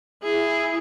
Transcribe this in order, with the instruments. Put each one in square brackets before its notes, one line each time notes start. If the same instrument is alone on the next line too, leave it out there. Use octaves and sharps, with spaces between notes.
[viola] E4 G#4